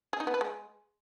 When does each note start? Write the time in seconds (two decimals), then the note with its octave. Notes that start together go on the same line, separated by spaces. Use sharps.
0.13 G#4
0.20 D#4
0.27 B3
0.34 B4
0.41 G#3